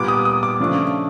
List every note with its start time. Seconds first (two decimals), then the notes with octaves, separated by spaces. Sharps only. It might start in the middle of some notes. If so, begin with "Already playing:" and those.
Already playing: A#2 G3 B3 D6
0.08 D#6
0.25 D#6
0.43 D6
0.60 C#3 F3 A3 D4